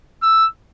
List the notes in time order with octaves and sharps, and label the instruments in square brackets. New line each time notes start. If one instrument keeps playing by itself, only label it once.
[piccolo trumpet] E6